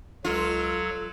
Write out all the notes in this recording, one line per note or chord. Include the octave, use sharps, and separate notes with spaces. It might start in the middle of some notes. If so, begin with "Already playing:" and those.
C#2 F#3 F4 A4